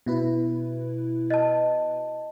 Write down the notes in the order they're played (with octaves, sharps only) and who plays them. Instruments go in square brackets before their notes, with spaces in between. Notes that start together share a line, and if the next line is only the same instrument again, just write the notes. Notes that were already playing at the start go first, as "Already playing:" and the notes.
[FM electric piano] B2 E4 B4
[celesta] D#5 A5